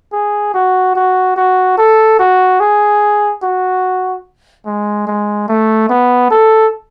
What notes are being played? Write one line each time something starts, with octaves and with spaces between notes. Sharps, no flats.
G#4
F#4
F#4
F#4
A4
F#4
G#4
F#4
G#3
G#3
A3
B3
A4